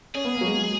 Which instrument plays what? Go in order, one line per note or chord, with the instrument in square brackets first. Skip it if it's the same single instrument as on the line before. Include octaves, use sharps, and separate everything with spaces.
[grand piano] C#4 [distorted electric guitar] G#4
[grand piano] B3
A#3
F#3
G#3